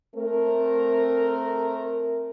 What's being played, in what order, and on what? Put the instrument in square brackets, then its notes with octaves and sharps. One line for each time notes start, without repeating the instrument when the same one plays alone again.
[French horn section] A3 C4 A#4